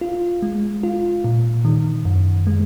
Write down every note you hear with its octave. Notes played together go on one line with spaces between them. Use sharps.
F4
G#3
F4
A#2
D#3
F#2
G#3